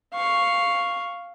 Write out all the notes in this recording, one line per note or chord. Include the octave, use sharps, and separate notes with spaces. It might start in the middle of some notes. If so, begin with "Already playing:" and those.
F5 C#6